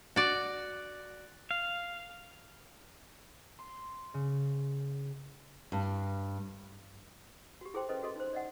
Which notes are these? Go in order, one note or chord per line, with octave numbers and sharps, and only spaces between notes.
F#4 D5
F5
C6
C#3
G2
F#4 G4
E4 G#4 A4 C5 G5 C6
C#4 E4 A4 B4 C5 D#5
F#4 G#4 A4 D#5 C6
D#4 C5
D5 D#5 F#5